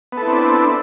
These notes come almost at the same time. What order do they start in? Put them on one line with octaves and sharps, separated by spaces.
B3 A4 E4 C4 D4